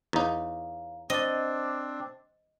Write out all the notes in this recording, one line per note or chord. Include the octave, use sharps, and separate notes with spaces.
E2 D#4 C#5 F5 A#5
C4 D4 C5 D#5 A6